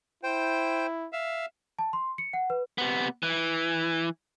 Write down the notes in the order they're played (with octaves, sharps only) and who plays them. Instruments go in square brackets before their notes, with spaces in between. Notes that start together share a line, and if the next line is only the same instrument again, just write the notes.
[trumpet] E4 [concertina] C5 G5
[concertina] E5 F5
[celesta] A5
C6
C#7
F#5
B4
[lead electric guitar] C3 B3
E3